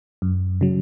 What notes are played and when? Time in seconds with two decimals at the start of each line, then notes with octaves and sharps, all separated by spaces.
0.22 F#2
0.61 C#3 F#3